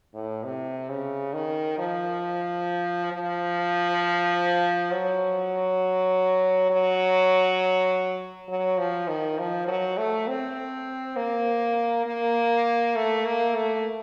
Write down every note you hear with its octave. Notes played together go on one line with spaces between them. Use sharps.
A2
C3
C#3
D#3
F3
F3
F#3
F#3
F#3
F3
D#3
F3
F#3
A3
C4
A#3
A#3
A3
A#3
A3